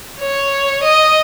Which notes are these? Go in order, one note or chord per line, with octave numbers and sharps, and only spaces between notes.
C#5
D#5